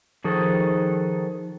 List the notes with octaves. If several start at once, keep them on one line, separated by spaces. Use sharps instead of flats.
D#3 F3 F#4 G#4 A4